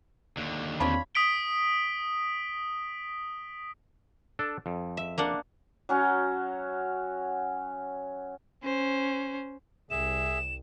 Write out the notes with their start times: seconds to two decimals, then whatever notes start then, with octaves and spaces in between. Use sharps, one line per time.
0.37 D#2 D3
0.80 E2 C4 D4 F4 C#5 B5
1.15 D#6 B6 D7 G7
4.39 D4 A4
4.66 F2
4.97 E5
5.18 A#3 D4 F#5
5.89 F#3 C#4 F#4
8.64 C#4 C5
9.91 C2 G#4 E5 E7